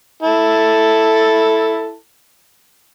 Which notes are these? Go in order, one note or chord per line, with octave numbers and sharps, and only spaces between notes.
E4 A4 A5